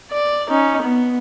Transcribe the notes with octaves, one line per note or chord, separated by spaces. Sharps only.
D5
C#4 D#4
B3